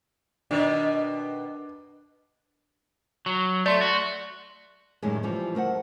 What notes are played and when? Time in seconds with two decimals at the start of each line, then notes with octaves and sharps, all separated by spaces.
0.51 B2 D#3 D4
3.26 F#3
3.66 A3 D5 C6 G7
3.81 F#4
5.02 F#2 A2 D#3 G3 G#3
5.23 C#3 E3 F3 G3
5.55 A3 A#4 C5 F#5